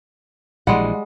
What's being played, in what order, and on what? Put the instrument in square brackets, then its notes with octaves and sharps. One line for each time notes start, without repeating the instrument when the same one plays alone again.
[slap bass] A#1 E3 [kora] G3 G#3 [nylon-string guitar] F#5